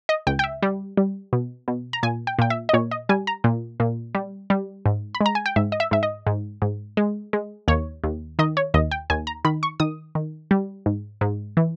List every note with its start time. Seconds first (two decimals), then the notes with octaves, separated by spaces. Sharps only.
0.09 D#5
0.27 C#2 G5
0.39 G5
0.44 E5
0.63 G3
0.97 G3
1.33 B2
1.68 B2
1.93 A#5
2.03 A#2 G#5
2.27 G5
2.39 A#2 G5
2.50 E5
2.69 D#5
2.74 A#2 C#5
2.91 D#5
3.09 G3 G#5
3.27 A#5
3.44 A#2
3.80 A#2
4.15 G3
4.50 G3
4.86 G#2
5.15 B5
5.21 G#3
5.26 A#5
5.35 G#5
5.46 G5
5.56 G#2 E5
5.72 D#5
5.80 E5
5.91 G#2 E5
6.03 D#5
6.27 G#2
6.62 G#2
6.97 G#3
7.33 G#3
7.68 D#2 C#5
8.04 D#2
8.39 D#3 D#5
8.57 C#5
8.74 D#2 D#5
8.91 G5
9.10 D#2 G#5
9.27 A#5
9.45 D#3 B5
9.63 C#6
9.80 D#3 D#6
10.15 D#3
10.51 G3
10.86 G#2
11.21 G#2
11.57 E3